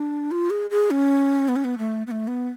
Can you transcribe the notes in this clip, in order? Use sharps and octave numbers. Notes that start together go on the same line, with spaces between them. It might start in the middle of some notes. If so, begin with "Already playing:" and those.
Already playing: D4
F4
G#4
G#4
C#4
B3
C#4
B3
A3
B3
A3
B3